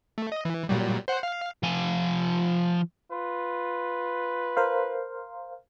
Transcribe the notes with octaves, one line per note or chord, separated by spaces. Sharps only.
A3
D#5
E3
A#2 F#3 G3
C5 F#5
F5
F3 G#5
F4 B4
A#4 C5 F5